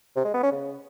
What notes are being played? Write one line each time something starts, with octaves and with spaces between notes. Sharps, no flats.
C3
G#3
B3
C#4
C#3